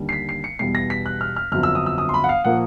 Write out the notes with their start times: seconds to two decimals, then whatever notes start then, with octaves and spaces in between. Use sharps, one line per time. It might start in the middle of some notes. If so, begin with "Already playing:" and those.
Already playing: D#2 D3 G3
0.09 C7
0.12 B6
0.29 C7
0.44 C#7
0.59 E2 B2 G3 C7
0.75 A#6
0.90 B6
1.06 F#6
1.21 F6
1.36 F6
1.52 G1 F2 D3 F#3 F6
1.63 E6
1.75 D#6
1.86 E6
1.98 D#6
2.09 C6
2.14 B5
2.24 F#5
2.29 F5
2.45 A#2 F3 A#3 F#5